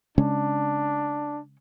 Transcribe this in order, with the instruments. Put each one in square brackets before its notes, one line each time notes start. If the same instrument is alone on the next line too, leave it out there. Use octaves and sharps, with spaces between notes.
[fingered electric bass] C#3 G#3 C#4 [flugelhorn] D4